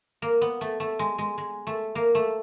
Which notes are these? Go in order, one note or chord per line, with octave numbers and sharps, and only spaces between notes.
A#3
B3
A3
A3
G#3
G#3
G#3
A3
A#3
A3